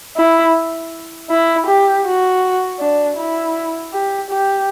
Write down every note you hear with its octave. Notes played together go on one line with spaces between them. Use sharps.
E4
E4
G4
F#4
D4
E4
G4
G4